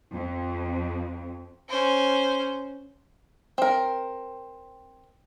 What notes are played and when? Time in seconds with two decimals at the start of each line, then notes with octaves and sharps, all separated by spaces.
0.13 F2
1.69 C#4 C5
3.58 C4 A#4